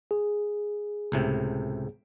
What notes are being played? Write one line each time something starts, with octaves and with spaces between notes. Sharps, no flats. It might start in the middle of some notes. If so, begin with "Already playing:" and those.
G#4
C#2 A2 C3